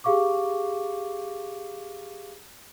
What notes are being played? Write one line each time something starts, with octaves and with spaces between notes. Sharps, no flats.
G4 G#4 F5 C#6 D6